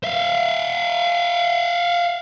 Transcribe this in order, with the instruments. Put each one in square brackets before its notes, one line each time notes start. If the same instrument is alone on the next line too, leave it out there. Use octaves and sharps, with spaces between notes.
[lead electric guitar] E5 F5